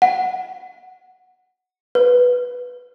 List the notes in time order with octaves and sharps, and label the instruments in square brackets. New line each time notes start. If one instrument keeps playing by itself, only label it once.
[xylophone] F#5
B4